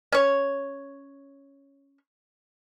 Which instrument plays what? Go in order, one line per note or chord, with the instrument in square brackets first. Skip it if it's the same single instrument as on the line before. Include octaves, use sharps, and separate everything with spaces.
[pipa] C#4 C#5